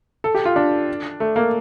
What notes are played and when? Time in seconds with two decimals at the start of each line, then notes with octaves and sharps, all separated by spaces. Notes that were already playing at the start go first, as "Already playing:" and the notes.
0.24 A4
0.35 G4
0.45 F4
0.56 D4
1.20 A3
1.36 A#3